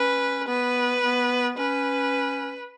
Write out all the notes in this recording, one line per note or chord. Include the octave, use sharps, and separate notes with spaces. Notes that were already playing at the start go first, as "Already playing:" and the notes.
Already playing: C#4 B4
B3 B4
B3
C#4 B4